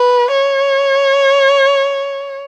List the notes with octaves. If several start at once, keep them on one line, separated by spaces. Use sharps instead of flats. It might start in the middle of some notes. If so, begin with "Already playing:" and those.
Already playing: B4
C#5